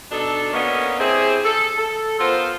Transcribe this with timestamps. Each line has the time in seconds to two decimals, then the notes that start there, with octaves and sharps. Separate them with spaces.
0.11 B2 D4 D#4 A4
0.53 A#3 B3 C#4 D4 C#5 D#5
0.99 C4 E4 G4 G#4
1.44 A4
1.77 A4
2.19 B3 F4 A4 A#4 C5